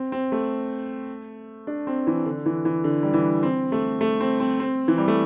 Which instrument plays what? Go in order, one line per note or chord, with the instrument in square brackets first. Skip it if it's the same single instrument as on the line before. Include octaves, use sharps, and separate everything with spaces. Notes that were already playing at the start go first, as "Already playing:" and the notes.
Already playing: [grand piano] C4
C4
A3
D4
C4
E3
D3
E3
E3
D3
G3
E3
C4
A3
A3
C4
C4
C4
E3
G3
A3